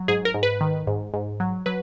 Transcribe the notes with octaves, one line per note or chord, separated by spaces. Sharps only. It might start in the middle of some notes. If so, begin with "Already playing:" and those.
Already playing: F#3
G#2 G#4
A#4
G#2
B4
D#3
G#2
G#2
F#3
F#3 B4